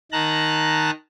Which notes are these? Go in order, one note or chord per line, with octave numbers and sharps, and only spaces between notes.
D#3 A5 A#5 F#6